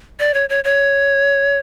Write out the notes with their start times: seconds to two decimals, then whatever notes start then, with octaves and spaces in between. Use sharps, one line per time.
0.19 D5
0.34 C#5
0.49 C#5
0.64 C#5